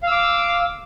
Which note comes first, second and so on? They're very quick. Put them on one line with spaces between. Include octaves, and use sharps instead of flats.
F5 E6 D6